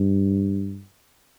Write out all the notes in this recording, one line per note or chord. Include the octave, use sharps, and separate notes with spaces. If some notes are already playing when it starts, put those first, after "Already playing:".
Already playing: G2